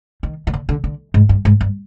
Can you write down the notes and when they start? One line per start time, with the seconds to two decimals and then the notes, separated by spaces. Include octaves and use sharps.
0.23 D#3
0.47 D#3
0.54 D3
0.69 D3
0.84 D3
1.14 G#2
1.29 G2
1.45 G#2
1.61 G2